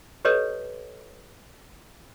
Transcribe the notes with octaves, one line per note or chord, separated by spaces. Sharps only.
G4 A4 B4 C#5 D#5